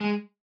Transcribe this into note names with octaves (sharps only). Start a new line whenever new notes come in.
G#3